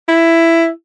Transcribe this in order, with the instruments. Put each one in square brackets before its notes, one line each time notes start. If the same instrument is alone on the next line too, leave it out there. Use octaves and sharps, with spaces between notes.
[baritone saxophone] E4